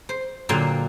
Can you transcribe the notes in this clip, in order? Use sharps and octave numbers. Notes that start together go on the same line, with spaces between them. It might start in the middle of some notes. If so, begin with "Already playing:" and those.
C5
A#2 D3 F#3 F5 G5 C6